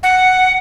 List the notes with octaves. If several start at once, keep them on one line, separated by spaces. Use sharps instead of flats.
F#5